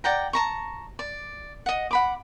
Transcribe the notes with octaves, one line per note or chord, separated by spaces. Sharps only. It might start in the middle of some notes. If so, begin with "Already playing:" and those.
D5 F#5 G5 A#5
A5 A#5 C#6
D5
D#5 F#5
F#5 B5 D6